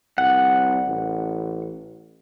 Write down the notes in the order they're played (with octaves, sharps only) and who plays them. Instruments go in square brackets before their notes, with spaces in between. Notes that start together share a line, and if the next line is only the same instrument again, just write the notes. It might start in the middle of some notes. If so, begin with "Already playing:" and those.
[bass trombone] C2 [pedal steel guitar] F#5
[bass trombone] A1